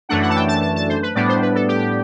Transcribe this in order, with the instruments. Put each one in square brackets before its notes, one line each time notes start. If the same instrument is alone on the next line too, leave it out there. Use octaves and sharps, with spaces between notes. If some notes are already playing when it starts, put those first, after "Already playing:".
[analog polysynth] F#2 E3 A3 D4 F#5
F#5
A5
G5
A5
A5
A5
C5
B4
A2 G3 B3 D4 D5
C5
B4
A4
G4